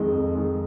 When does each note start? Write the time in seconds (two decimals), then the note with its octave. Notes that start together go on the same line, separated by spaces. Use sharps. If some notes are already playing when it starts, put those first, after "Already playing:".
Already playing: F2 D#3 G#3
0.11 F2
0.35 D#3 G#3